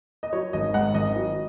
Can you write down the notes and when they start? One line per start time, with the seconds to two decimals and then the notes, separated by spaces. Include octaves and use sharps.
0.23 D#5
0.33 F#3 C#5
0.53 G#1 D#5
0.74 G#2 F#5
0.94 G#1 D#5
1.16 F#3